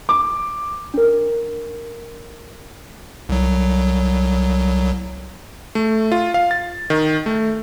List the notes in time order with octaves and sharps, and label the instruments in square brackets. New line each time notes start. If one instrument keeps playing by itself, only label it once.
[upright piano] D6
[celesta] D4 A#4
[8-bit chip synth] C2 F#3
[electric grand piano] A3
F4
F5
A6
D#3
A3